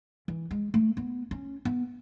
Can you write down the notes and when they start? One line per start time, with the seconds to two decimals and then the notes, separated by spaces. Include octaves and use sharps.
0.28 E3
0.51 G#3
0.74 A3
0.97 B3
1.31 C#4
1.65 B3